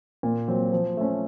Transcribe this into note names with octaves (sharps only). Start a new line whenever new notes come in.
A#2
F#3 C4
F3
A3 C#4